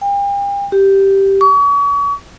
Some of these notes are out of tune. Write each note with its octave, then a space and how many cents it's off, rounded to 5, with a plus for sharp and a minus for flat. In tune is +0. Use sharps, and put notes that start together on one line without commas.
G5 +40
G4 -5
C#6 +40